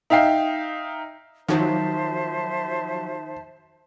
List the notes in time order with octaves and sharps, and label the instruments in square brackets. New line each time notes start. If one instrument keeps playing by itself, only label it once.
[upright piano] D#4 E5 F5 G5 C7
[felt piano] D#3 [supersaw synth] F3 F#3 [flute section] C5 E5 A5